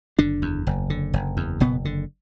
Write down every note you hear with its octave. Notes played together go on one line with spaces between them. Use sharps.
F#1 D3 D4
E2
F#1
D3
F#1
E2
F#1 B2 B3
D3